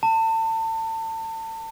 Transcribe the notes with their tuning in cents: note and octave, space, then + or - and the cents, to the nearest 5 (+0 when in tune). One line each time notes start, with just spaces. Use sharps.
A5 +30